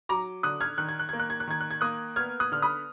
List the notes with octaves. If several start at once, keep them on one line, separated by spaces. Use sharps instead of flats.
F#3 A#5 D6
D3 D#6 F#6
F6 G#6
D#3 F#6
G#6
F#6
A#3 G#6
F#6
G#6
F#6
D#3 G#6
F#6
G#6
A#3 D#6 F#6
B3 F6 G#6
D#6 F#6
D3 F6
B5 D#6